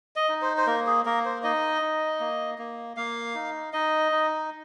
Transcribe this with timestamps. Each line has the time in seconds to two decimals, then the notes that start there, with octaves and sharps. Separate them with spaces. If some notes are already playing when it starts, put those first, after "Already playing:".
0.16 D#5
0.29 D#4
0.42 C5
0.57 C5
0.67 A#3 A#4
0.87 G#4
1.06 A#3 A#4
1.25 C5
1.43 D#4 D#5
1.82 D#4
2.20 A#3
2.58 A#3
2.97 A#3 F5
3.35 D#4
3.73 D#4 D#5
4.12 D#4